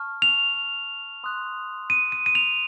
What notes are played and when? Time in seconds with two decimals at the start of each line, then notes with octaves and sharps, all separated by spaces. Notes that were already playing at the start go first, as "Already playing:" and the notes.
Already playing: A5 C#6 F6
0.22 F7
1.24 C6 D#6 F#6
1.90 D#7
2.12 D#7
2.26 D#7
2.35 F7